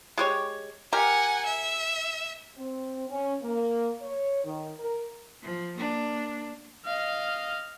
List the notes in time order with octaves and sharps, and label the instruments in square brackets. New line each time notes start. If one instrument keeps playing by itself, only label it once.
[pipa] G#3 G4 C#5
[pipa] G4 A#4 [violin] F#5 G#5
[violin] E5
[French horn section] C4
C#4
A#3
C#5
D#3
A#4
[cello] F3
A#3 D4
[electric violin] D#5 F5